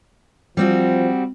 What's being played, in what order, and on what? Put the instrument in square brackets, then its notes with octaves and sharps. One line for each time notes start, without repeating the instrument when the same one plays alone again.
[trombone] F3 [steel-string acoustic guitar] G3 C4 F#4